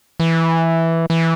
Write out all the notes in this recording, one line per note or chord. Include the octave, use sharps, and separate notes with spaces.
E3
E3